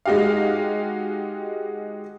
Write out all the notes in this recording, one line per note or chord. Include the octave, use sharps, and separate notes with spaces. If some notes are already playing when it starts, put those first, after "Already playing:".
G#3 D#4 F#4 G4 F5